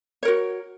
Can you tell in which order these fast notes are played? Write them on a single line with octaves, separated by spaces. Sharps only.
C#5 A#4 F#4